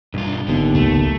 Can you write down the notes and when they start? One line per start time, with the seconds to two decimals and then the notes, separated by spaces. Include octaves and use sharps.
0.14 B1 G2 F4
0.48 G#1 D#2 D3 B3
0.75 C#2 D#3 F#3 A3